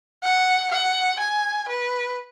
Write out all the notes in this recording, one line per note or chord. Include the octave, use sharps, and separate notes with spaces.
F#5
F#5
G#5
B4